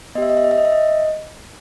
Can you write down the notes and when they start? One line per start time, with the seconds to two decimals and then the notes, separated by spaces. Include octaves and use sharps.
0.15 B3 D#5
0.18 G4 E5
0.30 D#5
0.37 E5
0.44 D#5
0.51 E5
0.58 D#5
0.65 E5
0.72 D#5